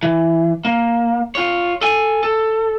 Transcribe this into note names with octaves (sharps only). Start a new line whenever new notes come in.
E3
A#3
F4 C#5
A4 G#5
A4